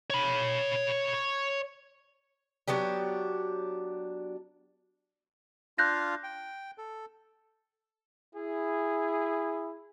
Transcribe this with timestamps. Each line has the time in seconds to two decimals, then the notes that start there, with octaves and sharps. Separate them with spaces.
0.10 C#5 B5
2.68 F#3 B3 D4 G4
5.78 D4 F4 F5 F#6 G6 A#6
6.24 G5
6.78 A4
8.35 E4 G#4